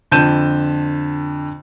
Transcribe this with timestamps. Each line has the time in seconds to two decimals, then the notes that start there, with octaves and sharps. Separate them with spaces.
0.11 F2 D3 A5 G6 D#7 E7